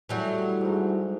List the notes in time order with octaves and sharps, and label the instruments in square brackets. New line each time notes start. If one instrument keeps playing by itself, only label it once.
[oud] E3 F#3 G3 [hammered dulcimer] A3
[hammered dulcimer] G#2 A#5